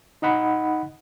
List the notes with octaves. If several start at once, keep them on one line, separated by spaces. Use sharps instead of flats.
D#4 D#5 F#5 B5